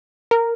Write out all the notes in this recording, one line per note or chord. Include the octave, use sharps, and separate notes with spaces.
A#4